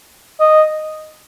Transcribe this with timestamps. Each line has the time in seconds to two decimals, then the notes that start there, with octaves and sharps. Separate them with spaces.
0.40 D#5